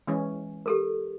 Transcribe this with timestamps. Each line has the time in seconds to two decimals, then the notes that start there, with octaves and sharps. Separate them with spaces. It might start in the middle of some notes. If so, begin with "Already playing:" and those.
0.07 E3 G#3 C#4
0.66 G4 A4 A#4